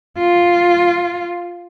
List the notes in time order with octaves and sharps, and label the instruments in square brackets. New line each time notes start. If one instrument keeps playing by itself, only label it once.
[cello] F4